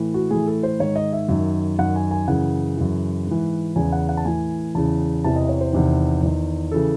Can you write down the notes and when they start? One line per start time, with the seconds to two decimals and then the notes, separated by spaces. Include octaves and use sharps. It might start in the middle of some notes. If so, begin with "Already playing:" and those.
Already playing: A2 E3
0.14 F#4
0.31 A2 E3 G#4
0.47 A4
0.63 C5
0.80 G#2 D#3 C#5
0.96 D#5
1.13 E5
1.29 F#2 D#3
1.79 F#2 D#3 F#5
1.96 G#5
2.11 G#5
2.28 F#2 C#3 E3 F#5
2.77 F#2 C#3 E3
3.27 G#2 E3
3.76 E2 C#3 E3 G#5
3.92 F#5
4.09 F#5
4.17 A5
4.25 A2 E3 G#5
4.75 E2 C#3 E3 A5
5.24 E2 C3 E3 A5
5.36 D#5
5.49 C#5
5.61 C5
5.73 E2 C3 D#3
6.23 E2 D#3
6.72 C#3 E3 A4